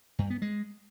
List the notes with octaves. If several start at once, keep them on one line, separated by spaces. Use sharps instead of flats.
G2
B3
G#3